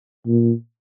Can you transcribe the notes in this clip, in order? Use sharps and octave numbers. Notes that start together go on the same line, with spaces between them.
A#2